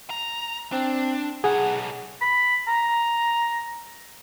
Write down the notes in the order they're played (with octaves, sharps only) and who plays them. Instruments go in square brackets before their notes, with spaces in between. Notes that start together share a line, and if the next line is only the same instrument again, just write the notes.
[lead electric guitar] A#5
[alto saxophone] C4 [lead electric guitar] D4
[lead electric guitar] B1 [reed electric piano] G#4 [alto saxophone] F#5
[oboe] B5
A#5